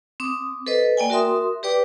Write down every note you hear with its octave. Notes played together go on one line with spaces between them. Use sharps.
C4 D6 D#6
A4 B4 C5 D#5
A#3 D5 G5 G#5
F#4 A#4 E5 C6 D#6
G4 B4 D5 G5 D6